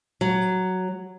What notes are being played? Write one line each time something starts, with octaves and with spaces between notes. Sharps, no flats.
F#3